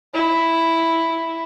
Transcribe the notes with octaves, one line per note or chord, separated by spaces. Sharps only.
E4